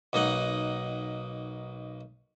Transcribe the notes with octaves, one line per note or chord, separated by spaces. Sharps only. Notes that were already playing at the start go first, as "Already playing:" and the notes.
B1 A#3 D#4 D#5 F#5